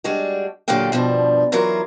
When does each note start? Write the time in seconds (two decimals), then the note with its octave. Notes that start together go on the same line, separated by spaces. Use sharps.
0.04 G3 G#3 D4 F#4
0.68 A#2 D3 F#3 G4 F5 G5
0.92 G2 B2 F3 D4
1.52 E3 F#3 E4 F4 A#4